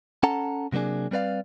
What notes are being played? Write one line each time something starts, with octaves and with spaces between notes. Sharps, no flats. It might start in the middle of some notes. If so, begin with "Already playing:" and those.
C#4 A4 F#5 A5 A#5
C3 F#3 A#3 D4 G#4
G3 C4 B4 D5 F5